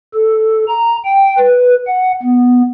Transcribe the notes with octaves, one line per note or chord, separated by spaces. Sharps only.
A4
A#5
G5
B4
F#5
B3